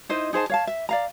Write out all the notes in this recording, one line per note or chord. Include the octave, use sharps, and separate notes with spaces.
D#4 E4 C5 D#5
D#4 G#4 C5 A5
C#5 F5 A5
E5
D5 F5 A#5